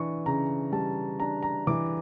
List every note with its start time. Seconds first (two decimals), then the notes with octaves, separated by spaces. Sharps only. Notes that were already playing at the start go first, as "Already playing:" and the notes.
Already playing: E3 D4 C#6
0.26 C#3 A#5
0.72 G3 A5
1.20 D4 A#5
1.43 A#5
1.67 E3 D6